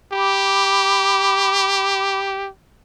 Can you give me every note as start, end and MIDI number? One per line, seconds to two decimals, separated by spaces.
0.13 2.49 67
0.13 2.27 83
0.13 2.27 86